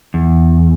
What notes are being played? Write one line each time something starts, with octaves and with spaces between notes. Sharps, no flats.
E2